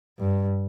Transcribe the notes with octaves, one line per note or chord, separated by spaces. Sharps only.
G2